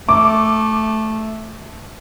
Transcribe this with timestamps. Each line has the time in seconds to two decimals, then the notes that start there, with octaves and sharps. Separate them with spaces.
0.09 A3 D6